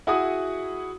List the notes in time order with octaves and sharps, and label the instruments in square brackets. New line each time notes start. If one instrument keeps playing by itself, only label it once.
[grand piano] E4 F#4 G#4 F#5 D#6